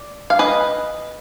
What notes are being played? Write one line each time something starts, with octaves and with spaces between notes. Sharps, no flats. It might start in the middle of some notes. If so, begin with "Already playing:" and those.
Already playing: D5
F5
B4 D#5